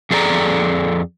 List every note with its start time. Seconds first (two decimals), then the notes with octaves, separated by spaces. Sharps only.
0.11 F2 G#4 A4 D5 A#5